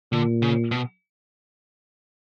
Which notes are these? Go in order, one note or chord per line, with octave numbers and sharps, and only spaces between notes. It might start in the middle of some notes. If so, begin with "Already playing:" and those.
A#2 D3
C#3
B2